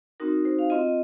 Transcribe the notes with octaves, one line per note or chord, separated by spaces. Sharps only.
C4 D#4 F#4 A#4
C5
F5
C4 F4 D#5